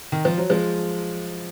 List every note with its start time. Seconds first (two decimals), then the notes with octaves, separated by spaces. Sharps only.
0.12 D#3
0.25 F3
0.38 F#3
0.50 F3 G#3